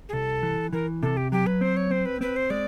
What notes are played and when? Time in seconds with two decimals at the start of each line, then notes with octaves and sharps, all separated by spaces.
0.09 G#4
0.13 C2 A4
0.43 E3
0.73 E3 A#4
1.02 C3 A4
1.17 G4
1.32 F#3 G4
1.47 B4
1.61 C4 C5
1.77 C#5
1.91 C4 C5
2.06 B4
2.21 C4 B4
2.36 C5
2.50 G#3 D5